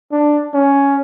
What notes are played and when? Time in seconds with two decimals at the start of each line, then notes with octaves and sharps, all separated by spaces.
0.12 D4
0.54 C#4